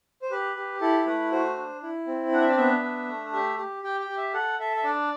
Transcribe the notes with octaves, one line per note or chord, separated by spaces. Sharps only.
C5
G4 B4
G4
E4 A4
A3 B4
F#4 C5
D4
E4
C4
D4 F#5
E5
D5
B3 E5
D4
A3
G4 E5
G4
G4 G5
G5
G4
E5
A4 F#5
A4 E5
E5
D4 D5